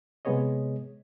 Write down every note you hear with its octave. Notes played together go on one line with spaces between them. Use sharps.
C3 G#3 B3 G#4 C#5 D#5